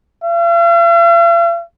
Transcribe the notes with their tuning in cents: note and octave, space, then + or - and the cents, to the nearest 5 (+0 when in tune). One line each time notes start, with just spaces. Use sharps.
F5 -45